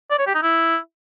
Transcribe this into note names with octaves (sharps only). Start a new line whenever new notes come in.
D5
C#5
G4
D#4
E4